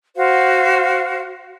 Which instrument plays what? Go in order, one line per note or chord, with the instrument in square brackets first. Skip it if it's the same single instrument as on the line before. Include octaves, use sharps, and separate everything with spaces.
[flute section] F#4 C5 F5